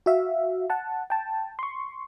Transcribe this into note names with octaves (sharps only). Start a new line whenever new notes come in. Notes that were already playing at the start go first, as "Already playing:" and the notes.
F#4 E5 F5
F#5 A5
G5 A5
C6 C#6